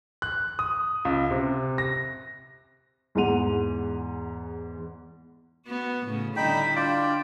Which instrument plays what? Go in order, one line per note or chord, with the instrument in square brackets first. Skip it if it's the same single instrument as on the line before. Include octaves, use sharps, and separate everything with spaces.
[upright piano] F#6
D#6
C#2
C3
A#6
E2 G#2 E3 F#5 D#7 F7
[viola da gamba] B3 F#4
A2 C#3
[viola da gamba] D3 G3 E4 [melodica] D#4 G5 [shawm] B5
[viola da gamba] D4 [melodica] F4 D5 [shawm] G5